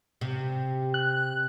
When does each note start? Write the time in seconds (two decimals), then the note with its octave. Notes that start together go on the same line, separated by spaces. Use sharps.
0.21 C3
0.94 F#6